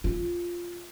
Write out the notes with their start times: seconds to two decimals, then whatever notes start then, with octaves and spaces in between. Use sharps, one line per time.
0.04 F4